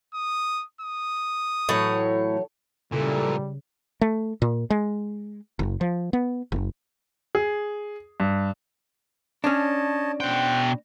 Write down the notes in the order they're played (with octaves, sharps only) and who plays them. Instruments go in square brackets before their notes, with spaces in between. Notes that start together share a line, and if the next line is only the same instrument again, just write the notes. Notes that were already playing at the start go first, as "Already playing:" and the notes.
[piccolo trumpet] D#6
D#6
[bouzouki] A2 [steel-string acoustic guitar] E3 F#3 C#5
[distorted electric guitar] A#2 E3 [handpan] C#3 [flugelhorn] G3 [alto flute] A4
[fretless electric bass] A3
A#2
G#3
F#1
F3
B3
F#1
[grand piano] G#4
G2
[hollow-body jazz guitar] C#4 D4 [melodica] C#5 D#5 A5
[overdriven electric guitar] B2 G5 [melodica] C5 F#5